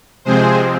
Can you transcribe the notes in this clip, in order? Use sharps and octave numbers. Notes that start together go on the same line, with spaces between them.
C3 F3 G#3 C4 G#4 C5